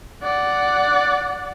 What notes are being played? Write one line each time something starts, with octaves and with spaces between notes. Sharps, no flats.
D5 F#5